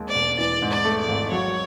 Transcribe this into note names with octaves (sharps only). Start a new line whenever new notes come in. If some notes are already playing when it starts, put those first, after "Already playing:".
Already playing: D#2 G#3
D5
E1
E3 D5
G#2
D5
A3
D5
G#1
F#3 C#5